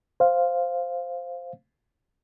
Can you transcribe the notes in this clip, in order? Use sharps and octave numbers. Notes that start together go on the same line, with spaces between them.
C5 F5